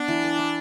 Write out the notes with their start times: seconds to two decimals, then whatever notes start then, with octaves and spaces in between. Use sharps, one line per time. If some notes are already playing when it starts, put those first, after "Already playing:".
Already playing: B3 D4
0.08 E3
0.24 B4
0.39 E4